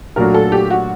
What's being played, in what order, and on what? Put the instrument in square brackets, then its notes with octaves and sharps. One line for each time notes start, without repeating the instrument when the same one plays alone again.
[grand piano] A#2 F#3 A3 D4 F#4 [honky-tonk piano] A#4
[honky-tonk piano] A4
G4
F#4